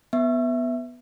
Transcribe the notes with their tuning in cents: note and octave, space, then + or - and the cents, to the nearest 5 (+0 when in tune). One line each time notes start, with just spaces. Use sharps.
B3 +0 E5 +0